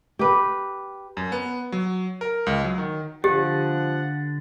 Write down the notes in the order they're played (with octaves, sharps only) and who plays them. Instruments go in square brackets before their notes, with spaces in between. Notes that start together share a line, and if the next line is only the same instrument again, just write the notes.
[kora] G4 B4
[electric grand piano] F#2
B3
F#3
A#4
C#2
F#3
D#3
[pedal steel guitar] D3 D4 [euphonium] F3 [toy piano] G4 [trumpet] F#5